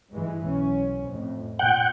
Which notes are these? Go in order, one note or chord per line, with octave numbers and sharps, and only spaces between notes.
G2 E3 G#3
B1 C#4
F2 A2
A#2 F#5 G5